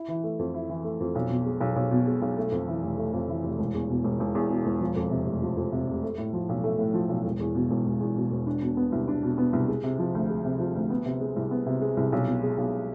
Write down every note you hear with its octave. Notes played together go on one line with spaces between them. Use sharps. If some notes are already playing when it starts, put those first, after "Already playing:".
Already playing: E4
E3
A3
F2
E4
E3
A3
F2
B1
B2
G#3
B1
B1
B2
G#3
B1
A3
F2
E3
F1
A3
F2
E3
F1
E1
E2
B2
E1
E1
E2
B2
E1
F3
F2
C3
F1
F3
F2
C3
F1
A3
A2
F3
B1
A3
A2
F3
B1
E1
E2
B2
E1
E1
E2
B2
E1
D4
B2
B3
C2
D4
B2
B3
C2
G#3
C3
F3
D2
G#3
C3
F3
D2
B3
C3
G#3
C2
B3
C3
G#3
C2
B1
B2
G#3
B1